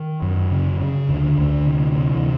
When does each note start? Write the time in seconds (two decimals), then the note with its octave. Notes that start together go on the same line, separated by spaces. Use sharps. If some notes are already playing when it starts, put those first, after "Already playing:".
Already playing: D#3
0.22 F#2
0.51 C#3
0.81 C#3
1.09 D2 D3
1.38 D2
1.67 C3
1.97 C3
2.15 E3